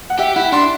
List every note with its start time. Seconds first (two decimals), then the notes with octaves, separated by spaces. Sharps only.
0.10 F#5
0.19 G4 E5
0.36 E4 F#5
0.52 D4 C6